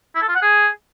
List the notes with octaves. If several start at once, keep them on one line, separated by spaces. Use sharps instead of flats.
E4
A4
F4
F#5
G#4